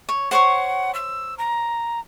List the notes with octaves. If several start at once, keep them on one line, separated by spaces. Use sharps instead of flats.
C#5
C5 C#5 F#5 C#6
E6
A#5